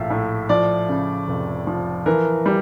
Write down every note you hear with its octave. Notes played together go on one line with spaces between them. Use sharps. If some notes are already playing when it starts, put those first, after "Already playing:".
Already playing: A#1 A2 E5 F5
A2
F3 D5
C#3
F1
F3
E3 A#4
G3